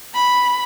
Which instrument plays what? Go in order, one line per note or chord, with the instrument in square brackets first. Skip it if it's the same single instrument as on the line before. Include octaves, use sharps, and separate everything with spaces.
[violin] B5